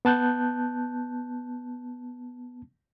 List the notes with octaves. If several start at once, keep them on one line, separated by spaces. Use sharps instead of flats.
B3 A5 F#6 G6